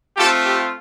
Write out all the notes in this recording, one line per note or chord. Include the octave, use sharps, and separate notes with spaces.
A3 C4 F4 G4 A4
G4